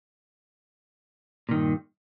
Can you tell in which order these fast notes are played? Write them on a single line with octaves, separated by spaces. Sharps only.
A#2 D#3 G2